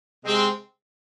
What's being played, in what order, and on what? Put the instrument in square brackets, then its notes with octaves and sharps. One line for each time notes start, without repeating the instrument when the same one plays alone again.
[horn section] C3 G#3 C4